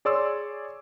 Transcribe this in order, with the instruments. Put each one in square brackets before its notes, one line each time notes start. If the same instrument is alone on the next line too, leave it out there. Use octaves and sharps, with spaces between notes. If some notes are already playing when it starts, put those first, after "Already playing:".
[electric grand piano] G#4 C#5 D5 C6 E6